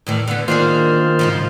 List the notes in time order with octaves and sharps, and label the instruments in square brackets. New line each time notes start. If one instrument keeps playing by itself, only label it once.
[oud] E2 A2 D#3
D3 B3
[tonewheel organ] D#3 F4 C5 [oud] A#3 D4 G#4
[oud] G#2 C#3 F3